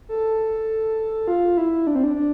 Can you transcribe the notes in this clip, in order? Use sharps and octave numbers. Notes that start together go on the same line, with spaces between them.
A4
F4
E4
D4
C4
D4
D4